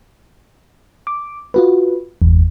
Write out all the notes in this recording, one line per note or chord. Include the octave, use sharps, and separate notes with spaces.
D6
F4 F#4 B4
G1 E2